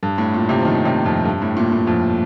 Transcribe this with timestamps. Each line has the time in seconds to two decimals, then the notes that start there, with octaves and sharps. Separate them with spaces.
0.03 G2
0.18 A2
0.34 A#2
0.49 C3
0.59 F3
0.65 D#3
0.85 C3
1.06 F2
1.25 G2
1.42 A2
1.57 A#2
1.72 A2
1.87 F2